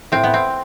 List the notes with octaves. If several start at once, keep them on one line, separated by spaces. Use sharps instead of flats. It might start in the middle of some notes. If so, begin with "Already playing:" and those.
A2 C4
B3
C4